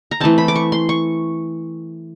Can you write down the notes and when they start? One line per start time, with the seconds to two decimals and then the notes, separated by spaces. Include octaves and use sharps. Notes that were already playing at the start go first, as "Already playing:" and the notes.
0.11 A#5
0.20 E3 A3 C4 A5
0.38 B5
0.48 D6
0.56 C#6
0.72 C6
0.89 C#6